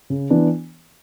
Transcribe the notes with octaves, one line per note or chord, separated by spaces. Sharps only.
C#3
E3 B3 D4